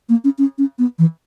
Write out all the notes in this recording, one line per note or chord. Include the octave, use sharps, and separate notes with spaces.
A#3
C#4
C#4
C#4
B3
E3